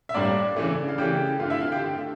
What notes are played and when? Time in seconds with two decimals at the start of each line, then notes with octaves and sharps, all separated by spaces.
0.09 E5
0.14 A2 G3 A#3 D4 D5
0.57 C#3 E3 A3
0.88 F5
0.98 C#3 E3 A3 G4 G5
1.39 A3 F4 F5
1.43 D3
1.50 E4 E5
1.61 F4 F5
1.72 G4 G5
1.82 D3 A3